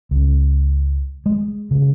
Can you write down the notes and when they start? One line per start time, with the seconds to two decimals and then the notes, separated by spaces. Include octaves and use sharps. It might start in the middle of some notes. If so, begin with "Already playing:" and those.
0.11 C#2
1.26 G#3
1.71 C#3